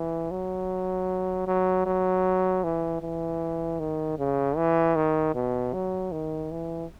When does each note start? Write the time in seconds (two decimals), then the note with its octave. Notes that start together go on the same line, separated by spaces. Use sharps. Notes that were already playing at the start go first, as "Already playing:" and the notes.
Already playing: E3
0.31 F#3
1.47 F#3
1.86 F#3
2.64 E3
3.02 E3
3.80 D#3
4.19 C#3
4.57 E3
4.96 D#3
5.35 B2
5.73 F#3
6.12 D#3
6.51 E3